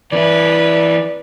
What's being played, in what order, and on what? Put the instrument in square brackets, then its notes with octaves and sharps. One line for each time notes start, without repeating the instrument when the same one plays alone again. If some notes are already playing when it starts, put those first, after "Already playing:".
[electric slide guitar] E3 C4 E4 [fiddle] B4 [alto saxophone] D5